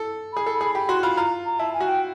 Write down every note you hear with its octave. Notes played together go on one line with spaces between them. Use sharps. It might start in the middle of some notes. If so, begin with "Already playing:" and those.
Already playing: A4
G#4 B5
A4
B5
G#4
G4 B5
F#4 C6
F4 B5
F4 A#5
A#5
E4 A5
G#5
F#4
G5